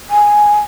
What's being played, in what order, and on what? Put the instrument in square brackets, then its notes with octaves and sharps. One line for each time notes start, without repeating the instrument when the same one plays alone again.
[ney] G#5